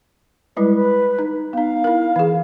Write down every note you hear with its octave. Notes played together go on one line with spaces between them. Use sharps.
G3 G#3 E4 B4
B4
D#4
B3 D#4 F5
E4 A#4
E3 G#4